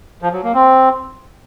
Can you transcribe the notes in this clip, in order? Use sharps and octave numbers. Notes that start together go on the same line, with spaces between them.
F3
F#3
A#3
C4